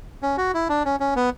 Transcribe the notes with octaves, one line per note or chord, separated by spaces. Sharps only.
C#4
F#4
E4
D4
C#4
C#4
B3